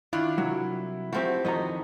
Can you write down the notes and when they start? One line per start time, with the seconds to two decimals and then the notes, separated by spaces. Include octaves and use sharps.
0.13 D#3 D4 E4 F4
0.38 C2 F#3
1.13 F3 A3 C4 F#4 G4
1.45 F2 D#3 F#4 D#5 A#5